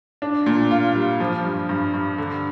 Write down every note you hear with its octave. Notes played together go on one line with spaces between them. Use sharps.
D4
A#2
F4
G3
F3
G2
G2
G2
D3